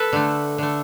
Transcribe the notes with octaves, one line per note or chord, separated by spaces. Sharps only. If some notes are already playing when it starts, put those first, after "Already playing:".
Already playing: A4 B4
D3 A3
D3 A3